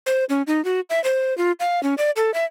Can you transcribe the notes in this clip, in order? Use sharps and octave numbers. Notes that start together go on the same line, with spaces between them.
C5
C#4
D#4
F#4
E5
C5
F4
F5
C#4
D5
A4
E5